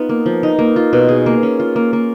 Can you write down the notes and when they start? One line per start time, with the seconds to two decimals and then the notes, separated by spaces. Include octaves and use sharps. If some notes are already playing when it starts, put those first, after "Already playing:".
Already playing: B3 D#4 F4
0.09 A#3
0.26 F3
0.43 D#4
0.59 A#3
0.76 F4
0.93 B2
1.09 G#4
1.26 A#3
1.43 C#4
1.60 F4
1.76 A#3
1.93 A#3